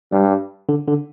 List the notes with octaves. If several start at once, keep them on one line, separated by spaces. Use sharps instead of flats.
G2 G3
D3
D3